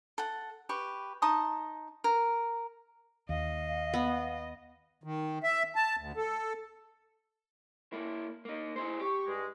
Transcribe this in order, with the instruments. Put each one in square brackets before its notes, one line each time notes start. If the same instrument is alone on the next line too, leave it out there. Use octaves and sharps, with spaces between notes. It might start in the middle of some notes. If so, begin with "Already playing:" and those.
[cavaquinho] A4 F#5
G4 B4 C#6
D#4 A5 C6 D#6
A#4
[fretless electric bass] D#2 [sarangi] D#5 [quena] F5
[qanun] B3
[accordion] D#3
E5
A5
D2
A4
[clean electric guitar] A#3 E4
A#3 D#4
E4 G#4 C5
[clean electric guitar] G4 [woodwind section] C#6
[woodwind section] G2 G#3